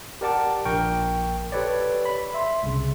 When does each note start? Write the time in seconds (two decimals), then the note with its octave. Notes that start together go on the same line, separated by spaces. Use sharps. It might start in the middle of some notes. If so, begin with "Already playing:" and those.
0.21 G4 A#4 D5 F#5 A5 D6
0.65 A#1 A#4 G5 C#6
1.52 G4 A4 B4 C#5 D5
2.05 B5
2.34 E5 C6
2.63 C2 C#3